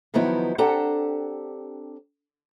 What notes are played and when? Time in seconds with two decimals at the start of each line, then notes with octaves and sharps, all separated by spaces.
0.14 D#3 F3 F#3 B3 D#4 E4
0.58 C4 D4 G4 A4 F#5 A#5